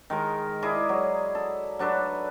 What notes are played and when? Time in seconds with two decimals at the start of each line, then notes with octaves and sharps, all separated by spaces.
0.10 D#3 G#3 A#4
0.62 E4 G#4 D5 D#5
0.89 F#3
1.35 A4
1.79 F#3 D4 A4 B4